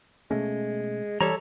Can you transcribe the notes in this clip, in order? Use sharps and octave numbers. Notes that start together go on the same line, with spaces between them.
B2 G#3 A3 C#4
E3 G3 A4 C#5 A#5